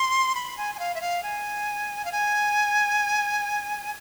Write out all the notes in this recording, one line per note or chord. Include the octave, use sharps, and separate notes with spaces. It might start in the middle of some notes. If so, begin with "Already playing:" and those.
Already playing: C6
B5
G#5
G#5
F5
E5
F5
G#5
F5
G#5